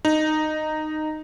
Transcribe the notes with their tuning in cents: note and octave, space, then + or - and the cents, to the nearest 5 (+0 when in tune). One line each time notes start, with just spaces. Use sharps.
D#4 -10